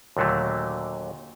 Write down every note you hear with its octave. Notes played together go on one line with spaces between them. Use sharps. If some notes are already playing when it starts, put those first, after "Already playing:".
D#2 A#2 D3 F#3 A3